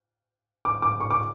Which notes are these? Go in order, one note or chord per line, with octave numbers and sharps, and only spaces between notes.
D6
D6
C#6
D6